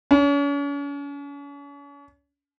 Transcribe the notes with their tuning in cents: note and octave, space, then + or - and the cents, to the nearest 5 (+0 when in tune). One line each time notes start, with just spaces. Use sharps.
C#4 +40